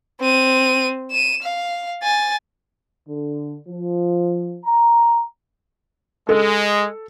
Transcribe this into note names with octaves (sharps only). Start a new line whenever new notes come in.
C4 D#7
D#7 E7
F5
G#5 A6
D3
F3
A#5
G#3 A4